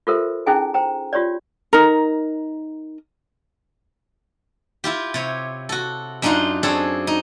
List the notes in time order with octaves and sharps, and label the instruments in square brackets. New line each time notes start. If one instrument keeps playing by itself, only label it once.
[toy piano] F4 G4 A4 A#4 C5 E5
C#4 D#4 E4 G#4 G5 G#5
C5 G5 A#5
F4 G4 C#5 D5
[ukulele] D#4 A#4
[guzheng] E4 F4 G4
C3 C#5
F#4 A4
F#2 D4 D#4 F4 F#5 C6
C4 D4 G#4 A4 C#5
D#4